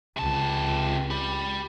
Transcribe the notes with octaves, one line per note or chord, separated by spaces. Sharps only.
C#2 C3 A5
G4 B5